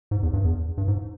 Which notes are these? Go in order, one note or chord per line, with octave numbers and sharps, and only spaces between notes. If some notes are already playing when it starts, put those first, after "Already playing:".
G#2
E2
G2
E2
G2
G#2